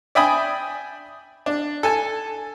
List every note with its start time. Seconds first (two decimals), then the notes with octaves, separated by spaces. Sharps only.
0.15 D5 E5 G5 G#5 B5 D#6
1.46 D4
1.83 A4 G#5 A5